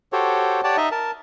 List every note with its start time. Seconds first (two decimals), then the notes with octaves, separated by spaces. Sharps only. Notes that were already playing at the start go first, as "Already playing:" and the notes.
0.13 F#4 G4 A4 C5 C#5
0.64 G4 C#5 D5 F#5 A5
0.77 D#4 D#5 E5
0.91 A#4 A5